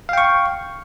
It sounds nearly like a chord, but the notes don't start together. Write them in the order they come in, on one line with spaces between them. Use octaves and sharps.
F5 G5 C#6